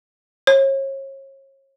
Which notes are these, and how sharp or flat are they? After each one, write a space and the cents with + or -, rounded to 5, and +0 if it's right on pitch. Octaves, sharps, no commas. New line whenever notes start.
C#5 -35